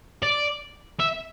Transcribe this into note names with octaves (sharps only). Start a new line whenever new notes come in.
D5
E5